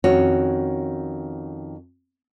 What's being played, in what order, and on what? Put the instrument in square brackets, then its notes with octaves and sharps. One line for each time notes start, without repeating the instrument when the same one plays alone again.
[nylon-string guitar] F2 D#3 C#4 F#4 C#5